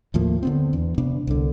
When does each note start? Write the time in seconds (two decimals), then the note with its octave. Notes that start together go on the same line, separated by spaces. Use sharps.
0.14 D#2 A2 F3 A#3
0.43 D3 B3 C4
0.73 E2
0.98 C3 B3 D4
1.27 C2 D3